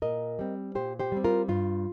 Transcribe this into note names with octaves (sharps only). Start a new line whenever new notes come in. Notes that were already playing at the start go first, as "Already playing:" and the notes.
A#2 A#4 D#5
G3 C4
A#2 G4 C5
G4 C5
G3 C4
F4 A#4
G2 F4